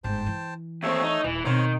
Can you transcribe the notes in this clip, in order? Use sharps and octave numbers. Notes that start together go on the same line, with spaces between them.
G1 G#2 C5 G5 A5
E3
D#2 A3 C4 C#5 E5
D#4
D#1 E3
B2 D#3 C4 C5 C#5